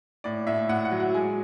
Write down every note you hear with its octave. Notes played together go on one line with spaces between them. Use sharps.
A2 D5
A2 E5
A2 F#5
F#5
F#3
F#5
G#3 G#5